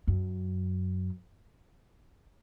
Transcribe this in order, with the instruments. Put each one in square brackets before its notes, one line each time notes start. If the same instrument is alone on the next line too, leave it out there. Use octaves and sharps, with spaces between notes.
[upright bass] F#2